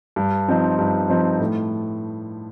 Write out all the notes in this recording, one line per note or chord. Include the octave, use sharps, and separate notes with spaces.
G2
F3 C4 D#4
G2
F3 C4 D#4
A2